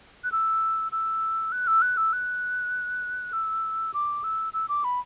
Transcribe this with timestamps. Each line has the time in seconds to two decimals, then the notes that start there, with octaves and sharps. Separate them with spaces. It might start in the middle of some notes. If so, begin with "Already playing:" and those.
0.24 F#6
0.32 E6
0.92 E6
1.52 F#6
1.67 E6
1.82 F#6
1.97 E6
2.13 F#6
3.33 E6
3.94 D6
4.24 E6
4.53 E6
4.69 D6
4.84 B5